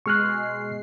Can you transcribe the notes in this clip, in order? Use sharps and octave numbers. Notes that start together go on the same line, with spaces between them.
B2 G#3 C#6 F6 F#6 C7